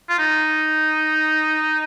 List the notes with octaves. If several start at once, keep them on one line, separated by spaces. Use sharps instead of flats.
F4
D#4